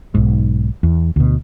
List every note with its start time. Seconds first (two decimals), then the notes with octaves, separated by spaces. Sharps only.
0.14 B1 G#2
0.83 E2
1.16 D2 B2